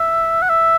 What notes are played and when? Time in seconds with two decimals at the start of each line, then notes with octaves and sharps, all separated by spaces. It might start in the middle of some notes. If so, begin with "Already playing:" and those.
Already playing: E5
0.42 F#5
0.49 E5